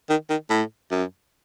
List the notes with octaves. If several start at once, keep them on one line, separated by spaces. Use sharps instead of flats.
D#3
D#3
A2
F#2